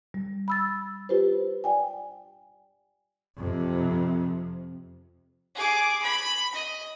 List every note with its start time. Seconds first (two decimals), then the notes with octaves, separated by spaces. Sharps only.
0.14 G3
0.48 B5 E6 A6
1.09 F4 G4 B4 C5
1.64 D5 G5 G#5
3.37 F2 C3
5.55 G#4 D6
6.03 B5
6.54 D#5